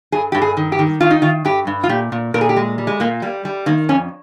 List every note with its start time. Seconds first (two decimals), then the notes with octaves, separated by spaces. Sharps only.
0.12 G2 G#4
0.32 G2 G4
0.42 G#4
0.57 D#3
0.72 G4
0.79 D#3
1.01 D#3 F4
1.11 D#4
1.22 D#3 F4
1.45 G2 G4
1.67 G2
1.84 F4
1.89 A#2 G4
2.12 A#2
2.34 A#2 A#4
2.41 G#4
2.49 G4
2.57 G#3
2.78 G3
2.87 G#3
3.00 A#2 A#3
3.22 G3 A#3
3.45 G3
3.66 D#3 A#3
3.89 F2 C#4